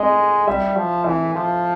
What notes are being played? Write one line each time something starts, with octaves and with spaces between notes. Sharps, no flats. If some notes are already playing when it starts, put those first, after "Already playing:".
Already playing: G#3 D#5
G3 E5
F3
E3 E5
F3